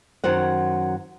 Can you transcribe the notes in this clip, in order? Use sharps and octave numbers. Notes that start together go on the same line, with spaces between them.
F#2 D#3 F#3 C5 F#5